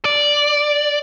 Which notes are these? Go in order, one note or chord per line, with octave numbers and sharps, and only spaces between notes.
D5